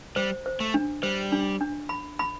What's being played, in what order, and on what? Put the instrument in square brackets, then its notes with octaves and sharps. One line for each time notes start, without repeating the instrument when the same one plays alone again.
[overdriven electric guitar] G3 [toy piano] C5
[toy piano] C5
[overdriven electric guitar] A3
[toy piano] D4
[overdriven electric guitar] G3 [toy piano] C5
[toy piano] D4
D4
B5
B5